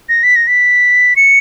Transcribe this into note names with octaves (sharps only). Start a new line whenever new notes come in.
A#6
B6
A#6
B6
C#7